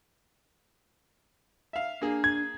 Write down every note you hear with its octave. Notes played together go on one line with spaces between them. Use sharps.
E5 F5
A#3 D4 G#4
G#6